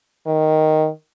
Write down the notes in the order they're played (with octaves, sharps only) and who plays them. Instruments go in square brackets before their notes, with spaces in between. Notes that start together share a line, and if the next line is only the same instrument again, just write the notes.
[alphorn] D#3